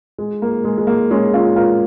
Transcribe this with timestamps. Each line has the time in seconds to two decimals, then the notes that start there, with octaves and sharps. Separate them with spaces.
0.18 G#3
0.42 A#3
0.65 G#3
0.78 G#3
0.87 A#3
1.11 G#3 C#4
1.34 C#4 F4
1.56 F4 A#4